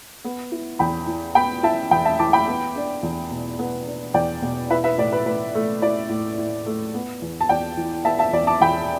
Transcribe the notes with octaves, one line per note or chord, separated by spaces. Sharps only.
B3
E4
E2 G5 B5
E3
B3 G5 B5
E4 E5 A5
E2 G5 B5
E5 A5
E3 A5 D6
G5 B5
B3
D4
E2
B2
B3
D4
E2 D5 G5
B2
E4 B4 E5
B4 E5
A2 D5
B4
A2 B4
A3
E4 D5
A2
A2
A3
B3
E2
A5
E2 D5 G5
E3
B3 E5 A5
E5 A5
E2 D5
A5 D6
E2 G5 B5